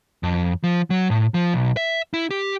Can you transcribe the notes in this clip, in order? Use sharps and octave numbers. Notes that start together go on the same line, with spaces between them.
F2
F3
F#3
A2
F3
B1
E5
E4
G4